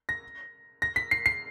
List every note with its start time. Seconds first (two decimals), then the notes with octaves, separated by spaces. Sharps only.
0.09 A#6
0.82 A#6
0.96 B6
1.11 C7
1.26 C7